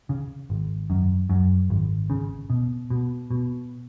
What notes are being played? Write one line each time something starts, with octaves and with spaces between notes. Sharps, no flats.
C#3
G#1
F#2
F#2
G#1
C#3
B2
B2
B2